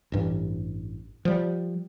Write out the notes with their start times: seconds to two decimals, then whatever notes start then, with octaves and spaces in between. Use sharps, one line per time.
0.12 A1 G2 E3
1.25 F3 G3